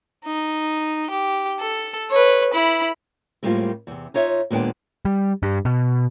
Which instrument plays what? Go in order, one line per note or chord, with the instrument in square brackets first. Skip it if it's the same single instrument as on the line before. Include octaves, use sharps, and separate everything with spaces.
[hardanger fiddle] D#4
G4
A4
B4 C#5
E4 B5
[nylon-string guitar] A2 G3 G#3 A#3 C4 F4
E2 C3
D#4 F4 C#5 E5
D#2 A#2 G#3 B3 D4 G5
[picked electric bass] G3
G2
B2